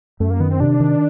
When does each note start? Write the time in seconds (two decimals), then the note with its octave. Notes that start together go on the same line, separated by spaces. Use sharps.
0.20 F#2 A3
0.30 A#3
0.40 D#3 B3
0.51 C4
0.60 C3 D4
0.80 D#3